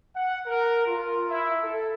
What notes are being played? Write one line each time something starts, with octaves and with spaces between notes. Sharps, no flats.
F#5
A#4
F4
E4
A4